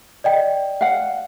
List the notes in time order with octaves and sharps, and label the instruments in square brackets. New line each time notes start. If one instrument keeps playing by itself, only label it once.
[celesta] D5 D#5 G5
[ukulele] F5 F#5